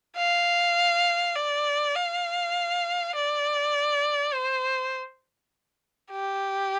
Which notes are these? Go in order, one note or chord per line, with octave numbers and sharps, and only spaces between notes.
F5
D5
F5
D5
C5
G4